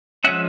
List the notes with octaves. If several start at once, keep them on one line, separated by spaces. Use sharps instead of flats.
F3 G#3 C#4 E5 F#5